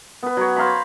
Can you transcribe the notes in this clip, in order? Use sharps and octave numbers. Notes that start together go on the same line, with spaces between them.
B3 B4
F#3 C#5
C5 F5 A#5 B5